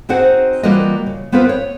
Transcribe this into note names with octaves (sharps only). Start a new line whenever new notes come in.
C4 D#4 F#4 G#4 C5 F#5
E3 G3 A#3 F4 F#4 D#5
C#3
B3 C4 F4 A#4 B4
C#5